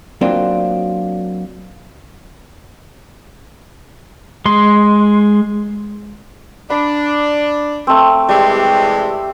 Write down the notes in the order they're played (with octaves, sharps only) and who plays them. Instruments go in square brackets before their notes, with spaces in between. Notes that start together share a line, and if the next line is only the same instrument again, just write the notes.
[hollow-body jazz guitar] F#3 A#3 C4 D4 F4
[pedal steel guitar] G#3 C6
[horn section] D4 [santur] B5
[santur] A3 C4
[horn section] C3 E3 G#3 [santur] G3